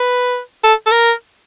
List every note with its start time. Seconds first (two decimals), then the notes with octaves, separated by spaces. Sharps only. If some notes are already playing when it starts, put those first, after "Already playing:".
Already playing: B4
0.64 A4
0.86 A4
0.91 A#4